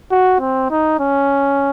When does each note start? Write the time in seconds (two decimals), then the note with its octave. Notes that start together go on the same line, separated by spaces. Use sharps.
0.11 F#4
0.41 C4
0.71 D#4
1.00 C#4